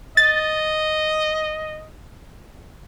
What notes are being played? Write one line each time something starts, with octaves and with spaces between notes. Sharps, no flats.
D#5 A6